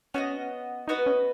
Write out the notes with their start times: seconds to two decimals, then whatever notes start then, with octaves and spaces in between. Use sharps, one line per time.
0.14 B3 C#4 F#4 B4 D#5
0.88 B3 D#4 F#4 B4 D#5
1.06 C#4